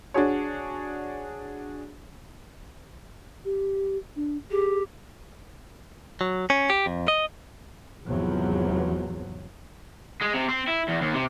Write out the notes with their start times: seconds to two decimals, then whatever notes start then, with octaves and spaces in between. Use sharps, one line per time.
0.14 D4 F#4 G#4 C#5
3.45 G4
4.16 D4
4.51 G4 G#4
6.21 F#3
6.50 C#4
6.70 G4
6.86 F2
7.08 D#5
8.04 G#1 E2 C3 F3 F#3
10.21 G#3
10.34 C3
10.48 C4
10.68 E4
10.89 E2
11.02 D#2
11.14 C3